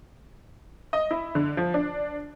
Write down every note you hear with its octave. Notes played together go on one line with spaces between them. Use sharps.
D#5
E4
D3
F3
D4